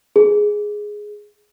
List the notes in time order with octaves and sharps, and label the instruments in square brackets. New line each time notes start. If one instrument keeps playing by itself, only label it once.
[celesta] G#4